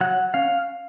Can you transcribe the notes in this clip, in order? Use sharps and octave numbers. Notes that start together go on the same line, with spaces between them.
F#3 F#5
C#4 F5